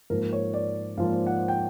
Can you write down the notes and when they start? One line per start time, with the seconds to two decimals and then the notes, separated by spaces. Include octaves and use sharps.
0.10 G#2 F3 A#3 A#4
0.33 C#5
0.54 D5
0.98 G#2 F3 A#3 F5
1.27 F#5
1.48 G5